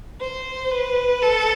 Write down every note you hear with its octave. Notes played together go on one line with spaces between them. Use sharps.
C5
B4
A4